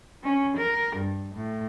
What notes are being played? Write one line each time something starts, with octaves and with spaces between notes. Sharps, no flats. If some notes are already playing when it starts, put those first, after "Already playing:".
C#4
A#4
G2
A2